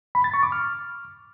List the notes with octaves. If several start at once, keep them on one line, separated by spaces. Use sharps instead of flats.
B5
A6
C#6
D6
F6